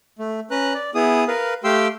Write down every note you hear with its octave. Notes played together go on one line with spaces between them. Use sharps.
A3
C#4 B4 A#5 F#6
D5
B3 E4 G#4 D#6
A#4 B4 F5
A3 G4 F5 G5 C6 E6